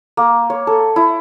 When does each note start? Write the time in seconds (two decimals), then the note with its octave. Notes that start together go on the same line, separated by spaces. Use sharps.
0.17 A#3
0.50 C#5
0.67 A4
0.96 E4